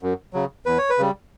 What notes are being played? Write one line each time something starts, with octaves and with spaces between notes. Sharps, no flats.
F#2
C#3 F#3
E2 B4
C#5
B4
C#3 G3